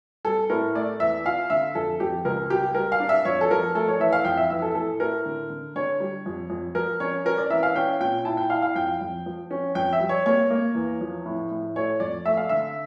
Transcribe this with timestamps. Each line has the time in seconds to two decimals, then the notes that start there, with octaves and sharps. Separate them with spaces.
0.25 G3 A4
0.50 A2 A#4
0.75 A3 D5
1.00 E2 E5
1.25 F4 F5
1.50 D3 E5
1.75 F2 A4
2.00 F2 G4
2.25 C#2 A#4
2.50 G3 G4
2.75 G3 A#4
2.92 F5
3.00 D4
3.09 E5
3.25 F2 C#5
3.41 A4
3.50 F3 A#4
3.75 A3 A4
3.88 C#5
4.00 E3 E5
4.13 F5
4.25 F2 G5
4.37 E5
4.50 E3 E5
4.62 A4
4.75 A2 A4
5.00 A2 A#4
5.25 D3
5.50 D3
5.76 D3 C#5
6.00 G3
6.26 F2
6.50 F2
6.75 F3 A#4
7.00 C#4 C#5
7.25 C#4 A#4
7.38 D5
7.50 E3 E5
7.63 F5
7.75 C#4 G5
8.00 A#2 G5
8.25 E4 A5
8.37 G5
8.50 E4 F5
8.62 F5
8.75 F2 G5
9.01 F2
9.26 F3
9.51 C#4
9.75 F2 G5
9.93 E5
10.00 G3
10.09 C#5
10.26 A#3 C#5
10.51 A#3
10.75 E2
11.01 F3
11.26 A2
11.51 A2
11.76 A3 C#5
12.00 F2 D5
12.26 A3 E5
12.37 F5
12.49 D3 E5